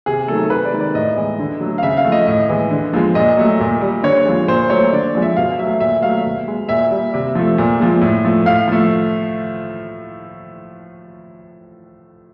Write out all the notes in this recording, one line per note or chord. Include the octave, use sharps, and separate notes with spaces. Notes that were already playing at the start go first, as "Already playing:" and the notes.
C3 G#4
D#3 F#3 A3 A4
C3 B4
D5
D#3 G#3
D5
A2 D#5
E3 G#3
D3
F#3 A3
F5
C#3 E5
F5
F3 A3
D#5
A2 D#5
E3 G#3
D3
F3 G#3
A#2 D#5
F#3 A3
A#2
G3
D3 C#5
F3 G#3
A#2 C5
F#3 A3 C#5
D3 D5
F3 G#3
E5
B2 F5
F#3 A3 E5
A#2 E5
F#3 A3 F5
B2
G#3
A#2 E5
G3
C3
F3 A3
A#2
F3 G#3
A2
F3 A3
A2 F5
F3 A3